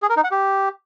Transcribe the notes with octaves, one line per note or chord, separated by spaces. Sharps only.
G#4
A#4
D#4
F#5
G4